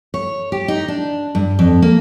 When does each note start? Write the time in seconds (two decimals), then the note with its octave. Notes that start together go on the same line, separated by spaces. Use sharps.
0.14 C#5
0.52 G4
0.68 D#4
0.88 D4
1.35 G2
1.59 F2
1.82 A#3